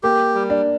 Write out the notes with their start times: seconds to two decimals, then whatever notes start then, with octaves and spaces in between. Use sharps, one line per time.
0.03 A#3 G4
0.34 G3
0.50 D4